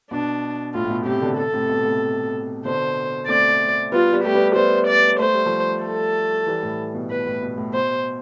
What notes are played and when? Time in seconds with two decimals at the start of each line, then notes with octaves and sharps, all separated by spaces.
0.11 B2 D4
0.74 A2 F4
0.85 A2
0.90 B2
1.06 A2 C3 G4
1.22 B2 D3
1.38 A4
1.53 A2 C3
1.69 B2
1.85 A2 C3
2.65 B2 D3 C5
3.28 A3 C4 D5
3.92 G3 B3 F4
4.13 G3 B3
4.24 A3 G4
4.34 G3 B3
4.56 G3 B3 C5
4.87 D5
5.19 A3 C5
5.34 G3
5.46 F3 A3
5.83 A4
6.47 E3 G3
6.63 A2
6.94 B2
7.10 B2 B4
7.26 A2
7.42 B2
7.58 A2
7.74 B2 C5